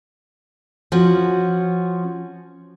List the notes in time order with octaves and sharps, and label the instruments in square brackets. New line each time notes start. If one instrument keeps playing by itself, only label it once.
[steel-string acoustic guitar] F3 C#4 F#4